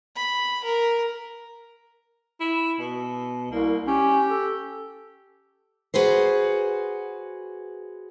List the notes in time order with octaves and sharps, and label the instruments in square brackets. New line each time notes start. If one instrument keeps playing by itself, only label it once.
[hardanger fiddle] B5
A#4
[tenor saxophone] E4
B2
[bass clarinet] C2 [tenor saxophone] A#3
[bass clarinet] C#4 [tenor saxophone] G4
[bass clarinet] A4
[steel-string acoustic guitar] F#4 G#4 B4 C5